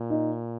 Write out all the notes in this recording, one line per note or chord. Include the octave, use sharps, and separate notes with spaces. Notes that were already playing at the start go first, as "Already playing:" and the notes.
Already playing: A#2
D#4